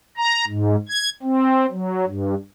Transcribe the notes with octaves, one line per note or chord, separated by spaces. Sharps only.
A#5
G#2
G#6
C4
F#3
G2